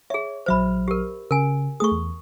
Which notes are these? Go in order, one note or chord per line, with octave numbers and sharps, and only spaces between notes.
G#4 C#5 E5
A#1 F#3 C5 E5 B5 F6
G4 A#4
C#3 A#4 G#5
A3 G#4 C#6 D#6
E2